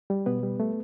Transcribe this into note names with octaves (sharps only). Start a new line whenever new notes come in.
G3
B2 B3 B4
G3
A3